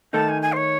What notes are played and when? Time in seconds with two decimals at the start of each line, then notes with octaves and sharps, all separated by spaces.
0.13 D#3 A3 D#4 A4 A5
0.28 G#5
0.42 G#5
0.52 C5
0.56 C#5